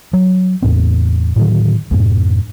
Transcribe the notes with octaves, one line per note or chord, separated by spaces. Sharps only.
F#3
E2 A2 C4
A2 D3 D#3 F#3
F2 G#2 B2 G#3